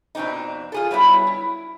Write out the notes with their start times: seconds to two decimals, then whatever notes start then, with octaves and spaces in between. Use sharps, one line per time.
0.15 F2 B2 C4 D4 D#4
0.72 F4 G#4 A4
0.91 F#3 G3 B3 E4
1.27 E4